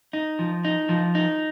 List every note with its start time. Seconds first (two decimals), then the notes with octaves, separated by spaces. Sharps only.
0.13 D#4
0.39 F3
0.65 D#4
0.89 F3
1.15 D#4